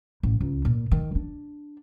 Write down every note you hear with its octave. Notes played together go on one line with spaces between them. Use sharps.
A1
C#2
A#2
D#3
D4